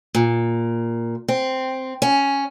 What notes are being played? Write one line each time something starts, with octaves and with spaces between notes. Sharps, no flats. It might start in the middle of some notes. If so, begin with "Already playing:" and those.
A#2
C4
C#4